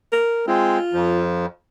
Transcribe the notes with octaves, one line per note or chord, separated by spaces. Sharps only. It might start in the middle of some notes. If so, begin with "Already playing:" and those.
A#4
G#3 C4 F4
F2 F3